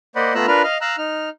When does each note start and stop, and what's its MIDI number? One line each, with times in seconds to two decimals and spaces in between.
0.16 0.34 58
0.16 0.34 72
0.16 0.34 74
0.16 0.34 75
0.16 0.34 78
0.16 0.34 83
0.35 0.46 57
0.35 0.46 59
0.35 0.46 65
0.35 0.46 82
0.35 0.46 88
0.35 0.46 90
0.48 0.62 62
0.48 0.62 65
0.48 0.62 70
0.48 0.62 71
0.48 0.62 83
0.48 0.62 89
0.64 0.78 75
0.64 0.78 77
0.64 0.78 89
0.81 0.96 77
0.81 0.96 82
0.81 0.96 88
0.81 0.96 90
0.98 1.29 63
0.98 1.29 89